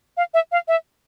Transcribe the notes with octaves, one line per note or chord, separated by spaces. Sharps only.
F5
E5
F5
E5